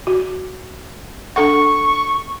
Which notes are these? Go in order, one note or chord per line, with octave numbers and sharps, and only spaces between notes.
F#4
D4 A4 F#5 C#6